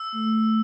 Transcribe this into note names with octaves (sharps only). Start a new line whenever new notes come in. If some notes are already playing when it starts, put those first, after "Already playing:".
Already playing: E6
A3